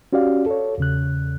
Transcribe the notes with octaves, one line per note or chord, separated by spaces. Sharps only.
C#4 F#4 G4 D5 F5
A4 C#5
E2 C#3 F#6